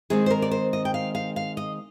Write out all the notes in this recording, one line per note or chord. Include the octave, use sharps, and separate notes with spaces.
D#3 G#3 C4 D#4 G#4
C5
A#4
D5
C5
D#5
G5
F5
F5
F5
D#5